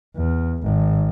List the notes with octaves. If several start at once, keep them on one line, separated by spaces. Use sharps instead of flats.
E2
G#1